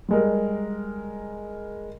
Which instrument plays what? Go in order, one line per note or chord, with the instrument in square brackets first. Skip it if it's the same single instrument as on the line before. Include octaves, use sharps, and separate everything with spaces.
[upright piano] G3 G#3 A#4